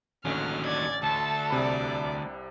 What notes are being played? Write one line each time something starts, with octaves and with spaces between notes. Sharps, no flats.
A1 D#2 D3 F#3 C#4 F6
D5 G#6 A6
D2 A4 A5
C2 C3 D5 B5